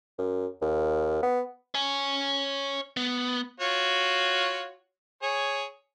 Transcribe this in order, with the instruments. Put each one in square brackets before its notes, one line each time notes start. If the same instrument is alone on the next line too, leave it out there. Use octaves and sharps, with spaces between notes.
[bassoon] F#2
D#2
B3
[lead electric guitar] C#5 G#5
B3
[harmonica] F4 F#4 C#5
G#4 C#5